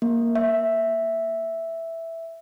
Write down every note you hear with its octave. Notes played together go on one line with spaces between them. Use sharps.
A#3
E5